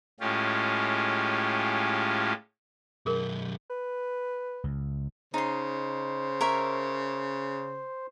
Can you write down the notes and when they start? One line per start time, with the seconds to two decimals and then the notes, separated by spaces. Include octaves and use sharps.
0.20 A2 G#3 C#4 F4 G4
3.06 B1 F#2 G#4 A#4
3.70 B4
4.64 C#2
5.34 C#3 D#4 C5 C6
6.41 A#4 C#5 E5